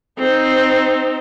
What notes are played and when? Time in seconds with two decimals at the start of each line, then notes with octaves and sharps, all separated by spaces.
0.19 C4 D#4